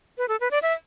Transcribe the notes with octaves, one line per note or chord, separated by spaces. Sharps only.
B4
A4
B4
D5
E5